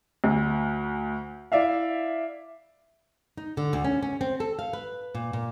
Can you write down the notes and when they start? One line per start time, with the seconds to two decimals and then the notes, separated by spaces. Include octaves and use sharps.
0.24 D2
1.52 E4 D5 E5 F5
3.37 D#4
3.57 D3
3.73 D2
3.84 C#4
4.03 C#4
4.21 C4
4.40 A4
4.59 F5
4.73 B4
5.15 A#2
5.33 A#2